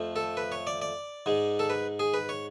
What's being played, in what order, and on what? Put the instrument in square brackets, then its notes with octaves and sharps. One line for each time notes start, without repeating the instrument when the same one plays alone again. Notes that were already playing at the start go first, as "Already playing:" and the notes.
Already playing: [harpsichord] F2 F3 A3
A4
B4
C#5
D5
D5
G#2 G#3
A4
B4
G#4
B4
C#5